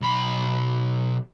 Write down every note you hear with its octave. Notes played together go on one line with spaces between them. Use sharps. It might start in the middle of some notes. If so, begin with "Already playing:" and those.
B1 B5